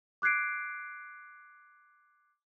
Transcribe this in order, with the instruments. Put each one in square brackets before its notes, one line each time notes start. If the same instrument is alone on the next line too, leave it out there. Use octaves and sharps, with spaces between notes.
[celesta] D6 F#6 G#6 C7 D7